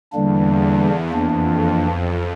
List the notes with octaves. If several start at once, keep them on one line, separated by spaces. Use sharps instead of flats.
E2 D3 G3 A#3 D4
F2 E3 A#3 D4